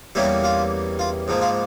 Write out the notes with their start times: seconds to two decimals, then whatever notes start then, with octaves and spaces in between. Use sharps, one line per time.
0.15 E2 E3 G3 A#3 C#4 E4
0.44 F4
0.99 F4
1.28 G#2 F3 A#3
1.42 F4